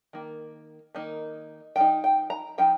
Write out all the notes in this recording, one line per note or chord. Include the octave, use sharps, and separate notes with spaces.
D#3 A#3
D#3 A#3 D#4
F3 D#4 G5
G5
A#5
F3 D#4 G5